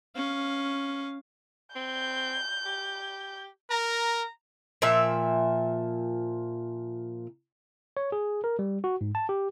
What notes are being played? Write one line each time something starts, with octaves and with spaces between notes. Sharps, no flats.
C#4 F5
C4 G6
G4
A#4 A#5
A#2 F3 E5
C#5
G#4
A#4
G3
F#4
G#2
A5
G4